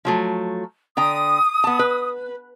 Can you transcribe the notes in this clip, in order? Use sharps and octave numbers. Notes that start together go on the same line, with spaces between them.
F3 F#3 A3
D3 G5 A#5 D#6
B3 A5
B4